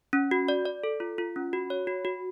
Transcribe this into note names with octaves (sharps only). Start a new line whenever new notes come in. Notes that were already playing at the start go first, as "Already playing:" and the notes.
C#4
F#4
D5
D5
A4
F4
F4
C#4
F#4
C#5
F#4
F#4